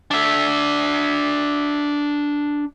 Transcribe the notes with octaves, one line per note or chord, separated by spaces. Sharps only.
D4 E5